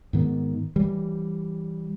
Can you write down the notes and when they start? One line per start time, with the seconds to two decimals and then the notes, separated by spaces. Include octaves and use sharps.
0.13 G#2 D#3 B3
0.76 E3 G3